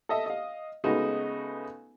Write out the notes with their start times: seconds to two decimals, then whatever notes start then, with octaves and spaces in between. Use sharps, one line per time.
0.09 A4 D#5 E5
0.26 D#5 F5
0.84 C#3 G#3 A3 B3 D#4 F#4